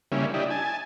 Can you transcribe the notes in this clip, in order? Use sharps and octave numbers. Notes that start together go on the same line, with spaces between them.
C#3 G3 A#3 C#4 E4
D4 E4 G4 D#5
G#5 A5